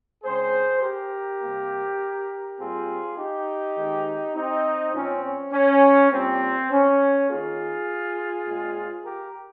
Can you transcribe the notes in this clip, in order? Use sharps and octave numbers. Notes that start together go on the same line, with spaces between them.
C#3 G#3 C4 G#4 C5
G4 A#4
C3 G3 A#3
A#2 G3 C4 F4 G#4
D#4 G4
D#3 G#3 C4
C4 D#4
A#2 F3 C4 C#4
C#4
C#4
A#2 G3 A#3 C4
C#4
D#3 A#3 F4 G#4
A#2 G#3 C4
G4 A#4